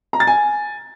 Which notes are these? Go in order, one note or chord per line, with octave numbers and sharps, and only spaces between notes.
A#5
A6
G#5